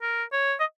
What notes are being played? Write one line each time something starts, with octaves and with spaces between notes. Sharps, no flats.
A#4
C#5
D#5